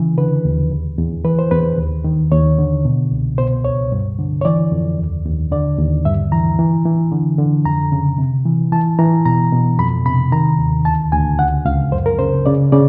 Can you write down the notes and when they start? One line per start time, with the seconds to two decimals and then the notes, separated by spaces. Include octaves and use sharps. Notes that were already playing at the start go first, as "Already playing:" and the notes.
Already playing: C#3 E3
0.18 D3 B4
0.45 D#2
0.71 E2
0.98 E2
1.24 E3 B4
1.39 C5
1.51 E2 B4
1.78 D#2
2.04 D#3
2.32 D#2 C#5
2.58 D3
2.85 B2
3.12 C2
3.38 B2 C5
3.64 C#2 C#5
3.92 G2
4.19 D3
4.41 C#5
4.45 E3 D5
4.72 F2
4.98 D#2
5.25 D#2
5.52 D3 D5
5.79 D#2
6.05 G2 E5
6.32 E3 A#5
6.59 E3
6.85 E3
7.12 D3
7.38 D3
7.65 F2 A#5
7.92 C#3
8.18 C3
8.45 E3
8.72 E3 A5
8.99 E3 A#5
9.26 B2 A#5
9.52 B2
9.78 F2 B5
10.06 C3 B5
10.32 D#3 A#5
10.59 D#2
10.85 D2 A5
11.12 D2 G#5
11.39 C#2 F#5
11.66 C#2 F5
11.92 F#2 C5
12.06 A#4
12.19 C#3 C5
12.46 C#3 D5
12.72 C#3 D5